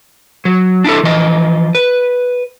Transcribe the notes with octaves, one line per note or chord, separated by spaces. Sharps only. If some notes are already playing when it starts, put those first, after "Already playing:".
F#3
D4 E4 A4
E3 F3 D#5
B4